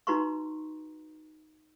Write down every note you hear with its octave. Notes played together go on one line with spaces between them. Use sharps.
D#4 F#4 B4 A#5 C6 C#6